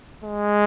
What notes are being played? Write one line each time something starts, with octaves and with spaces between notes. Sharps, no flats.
G#3